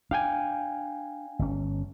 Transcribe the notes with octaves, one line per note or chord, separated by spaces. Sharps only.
D4 F5 G5 G#5
G1 C#4